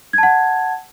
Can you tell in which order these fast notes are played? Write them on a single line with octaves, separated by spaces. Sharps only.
G#6 A5 F#5